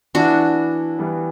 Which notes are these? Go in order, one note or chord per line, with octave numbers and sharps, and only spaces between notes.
E3 B3 D4 E4 F#4
E3 G3 B3